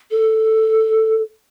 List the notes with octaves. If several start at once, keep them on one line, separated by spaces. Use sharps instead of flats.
A4